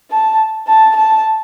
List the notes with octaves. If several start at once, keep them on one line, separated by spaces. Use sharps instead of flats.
A5
A5
A5